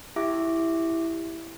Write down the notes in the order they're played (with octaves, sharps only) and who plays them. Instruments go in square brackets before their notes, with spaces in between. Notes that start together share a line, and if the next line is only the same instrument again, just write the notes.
[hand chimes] E4 G4 E5 D6